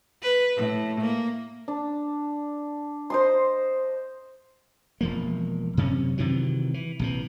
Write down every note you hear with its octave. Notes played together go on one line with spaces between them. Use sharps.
B4
A2
A#3
D4
C5 D#5 C6
E1 F3 A#3
F#2 C3 C#4
C3 D#3 E3 F#3
E3
A#1 C3 E3